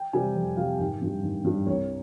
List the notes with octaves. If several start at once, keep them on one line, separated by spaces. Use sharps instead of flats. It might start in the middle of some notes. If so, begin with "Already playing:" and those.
Already playing: G5
C3 G3 C4 G#5
F2
C3 G3 C4 F5
G#1 G5
G2 G3
G#1
G2 G3
C2 C#5